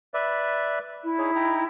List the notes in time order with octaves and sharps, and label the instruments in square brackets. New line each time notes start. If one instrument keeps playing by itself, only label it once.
[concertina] B4 D5 E5
[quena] E4
[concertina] D#4 G#4 C#5
D#4 G5 A#5